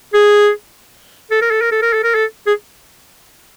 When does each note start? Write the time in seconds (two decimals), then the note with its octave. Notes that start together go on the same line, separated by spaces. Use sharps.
0.14 G#4
1.31 A4
1.42 A#4
1.51 A4
1.62 A#4
1.72 A4
1.82 A#4
1.94 A4
2.04 A#4
2.15 A4
2.47 G#4